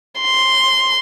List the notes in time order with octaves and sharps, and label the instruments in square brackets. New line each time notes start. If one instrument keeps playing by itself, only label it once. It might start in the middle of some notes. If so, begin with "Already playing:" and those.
[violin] C6